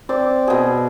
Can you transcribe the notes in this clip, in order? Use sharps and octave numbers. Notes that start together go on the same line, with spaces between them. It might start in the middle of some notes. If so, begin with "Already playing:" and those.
C4 D5
B2 G#4